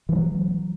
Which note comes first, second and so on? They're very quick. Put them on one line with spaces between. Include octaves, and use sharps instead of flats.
E3 G3 F#3